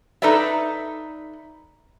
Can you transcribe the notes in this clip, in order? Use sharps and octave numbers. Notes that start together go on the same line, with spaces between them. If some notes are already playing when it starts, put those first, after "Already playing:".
D#4 A4 B4 D5 E5